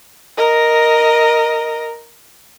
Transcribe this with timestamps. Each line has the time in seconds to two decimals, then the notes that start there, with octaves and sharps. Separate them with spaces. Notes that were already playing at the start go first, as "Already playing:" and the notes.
0.37 A#4 D#5